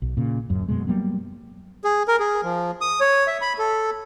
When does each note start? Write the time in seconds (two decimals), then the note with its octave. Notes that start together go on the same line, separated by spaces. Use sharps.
0.02 B1
0.17 A#2 C#3
0.49 D1 F#2
0.68 F#2 B2 G#3
0.87 F#3 G3 A#3 B3
1.84 G#4
2.08 A#4
2.20 G#4
2.44 F3
2.81 D#6
3.00 C#5
3.27 E5
3.41 B5
3.58 A4